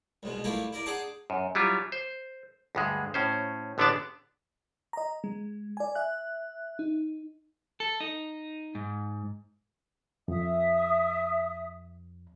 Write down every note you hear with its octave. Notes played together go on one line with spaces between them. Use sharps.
C2 G#2 B2
G3 A3 A#3 E4 F4 G4
E4 A#4 D5
D4 G#4 F#5 G5 A5 C6
F#2
F#3 G3 E4 F4
C5
D2 G2 G#3
A2 C#4 C5
A1 D3 B3 D4 D5 A5
D#5 A#5
G#3
D5 G#5
E5 F#6
D#4
A4
D#4
G#2
F2 E5 D#6